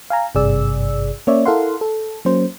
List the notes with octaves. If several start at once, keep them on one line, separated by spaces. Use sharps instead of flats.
F5 G#5 A#5
G#1 G2 C3 G#4 D5 E6
A#3 C#4 C#5 D5 E5
E4 A4 A#4 F5 F#5 C6
A4
F#3 A#3 C#4 C5